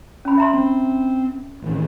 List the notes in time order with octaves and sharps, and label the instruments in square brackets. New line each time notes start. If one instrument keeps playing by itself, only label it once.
[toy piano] C#4 B5
E5 A#5 C6
[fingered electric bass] C4
A1 D#3